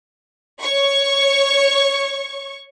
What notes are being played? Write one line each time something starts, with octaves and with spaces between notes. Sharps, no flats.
C#5 C#6